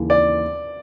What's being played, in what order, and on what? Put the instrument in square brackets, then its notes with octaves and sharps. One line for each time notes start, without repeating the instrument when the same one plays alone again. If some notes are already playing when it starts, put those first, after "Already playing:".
Already playing: [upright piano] D#2 C#3 E3
[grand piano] D5